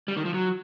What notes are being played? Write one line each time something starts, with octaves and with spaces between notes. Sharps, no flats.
G3
D#3
F3
F#3